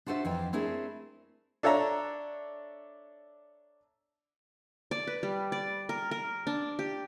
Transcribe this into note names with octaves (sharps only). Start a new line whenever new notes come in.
D4 F4 F#4 A4 C5 E5
F2 E3 F3 G5
A3 C4 D4 E4 G#4 A#4
D4 A4 C#5 E5 A#5
D5
B4
G3
D5
A#4
A#4
D4
G4